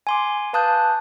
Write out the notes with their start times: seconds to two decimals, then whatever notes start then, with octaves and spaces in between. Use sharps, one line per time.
0.07 G#5 C6 D6
0.53 B4 F5 A5 D#6 F#6 G6